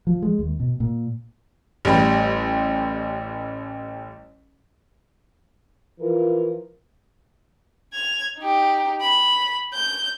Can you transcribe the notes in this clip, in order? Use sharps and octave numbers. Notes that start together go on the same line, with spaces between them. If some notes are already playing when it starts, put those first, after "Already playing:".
F3
G#3
D#2
B2
A#2
A1 G3
E3 F3 F4 A#4
G#6 F7
D#4 G4
B5
G6